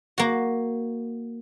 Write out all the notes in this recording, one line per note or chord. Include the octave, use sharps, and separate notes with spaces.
A#3 F#4